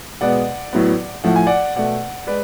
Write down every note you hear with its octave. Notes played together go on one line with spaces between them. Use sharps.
B2 G#3 B3 D5 F#5
A2 F#3 B3
A2 F3 A3 F#5
G#5
D5 F#5
B2 A3 D5 F#5
G#3 B4 D5